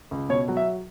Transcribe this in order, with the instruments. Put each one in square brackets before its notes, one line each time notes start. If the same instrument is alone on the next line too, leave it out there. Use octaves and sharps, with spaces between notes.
[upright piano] C#2
B2 C#5
F#3
E5